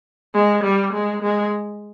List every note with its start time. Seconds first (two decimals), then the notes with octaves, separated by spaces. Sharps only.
0.34 G#3
0.64 G3
0.93 G#3
1.23 G#3